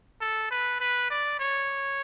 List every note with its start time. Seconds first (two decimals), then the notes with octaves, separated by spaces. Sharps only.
0.21 A4
0.51 B4
0.80 B4
1.10 D5
1.40 C#5